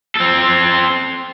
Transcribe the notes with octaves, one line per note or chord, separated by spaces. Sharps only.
C4 A4